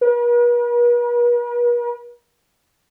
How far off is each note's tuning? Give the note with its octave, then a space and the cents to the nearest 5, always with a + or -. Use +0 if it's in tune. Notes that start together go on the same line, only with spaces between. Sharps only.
B4 -45